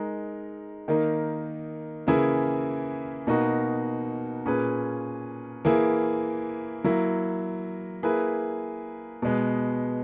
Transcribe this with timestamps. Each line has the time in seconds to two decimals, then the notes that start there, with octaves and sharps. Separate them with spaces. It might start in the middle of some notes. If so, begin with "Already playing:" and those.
Already playing: G#3 D#4 A#4
0.88 D#3 A#3 D#4
2.07 C#3 E3 A#3 E4 G#4
3.27 B2 A#3 D#4 F#4
4.45 A#2 A#3 C#4 G#4 B4
5.65 E3 A#3 E4 G#4
6.84 F#3 A#3 E4
8.03 A#3 E4 G#4 B4
9.22 B2 G#3 B3